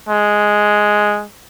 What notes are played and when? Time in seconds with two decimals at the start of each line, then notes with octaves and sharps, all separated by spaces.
0.09 G#3